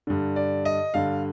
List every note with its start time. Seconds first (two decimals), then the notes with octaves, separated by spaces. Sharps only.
0.07 G2 D3
0.36 D5
0.65 D#5
0.94 G2 D3 F5